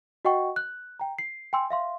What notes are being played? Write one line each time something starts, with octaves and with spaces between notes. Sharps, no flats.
F#4 D#5 F#5 G5 C#6
F#6
G5 A#5
C7
G5 G#5 C6 E6
E5 F5 C6